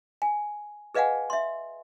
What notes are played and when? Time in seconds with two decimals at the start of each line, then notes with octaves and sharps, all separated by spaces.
0.22 G#5
0.95 G#4 B4 D#5 F5 F#5 G#5
1.30 E5 C6